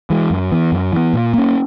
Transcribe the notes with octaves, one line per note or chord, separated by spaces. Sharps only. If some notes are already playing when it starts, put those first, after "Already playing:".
E3 G#3
F#2
E3 B3
F#2
E3 B3
A#2
A#3 C#4